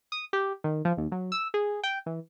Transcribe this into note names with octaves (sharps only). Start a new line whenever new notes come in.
D#6
G4
D#3
F3
D#2
F#3
E6
G#4
G5
E3